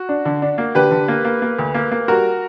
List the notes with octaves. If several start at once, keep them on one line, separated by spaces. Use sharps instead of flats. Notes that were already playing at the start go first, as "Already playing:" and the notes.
Already playing: F#4
D4
D3
D4
A#3
D3 G4 B4
D3
A#3
A#3
A#3
D2
A#3
A#3
G3 F#4 A#4